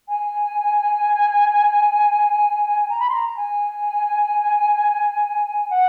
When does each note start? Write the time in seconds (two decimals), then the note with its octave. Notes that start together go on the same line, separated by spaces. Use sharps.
0.09 G#5
2.89 A#5
2.99 B5
3.09 C6
3.13 A#5
3.36 G#5
5.70 F#5